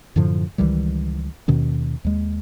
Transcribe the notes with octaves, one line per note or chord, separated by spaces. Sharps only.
F#2 A2 D3 F3
C#2 D#3 E3 G3
D#2 B2 D#3 C#4
D#2 G#3